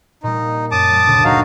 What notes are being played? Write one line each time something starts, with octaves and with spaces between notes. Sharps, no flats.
A#2 G3 D#4
F#2 A5 D6 D#6
G3
F#1 D2 A#2
F#3 D#4 F#4 F5